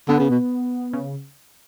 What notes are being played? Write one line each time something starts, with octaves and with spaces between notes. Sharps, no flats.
D3 B3
C#3
B2
C#3